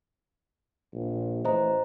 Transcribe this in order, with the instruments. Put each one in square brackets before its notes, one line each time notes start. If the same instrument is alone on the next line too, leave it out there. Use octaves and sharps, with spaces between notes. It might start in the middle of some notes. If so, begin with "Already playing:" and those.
[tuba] A#1
[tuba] A1 [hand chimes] C5 D#5 A#5